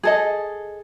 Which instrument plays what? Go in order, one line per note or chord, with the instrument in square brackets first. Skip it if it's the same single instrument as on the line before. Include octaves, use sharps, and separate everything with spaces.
[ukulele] G#4 A4 D#5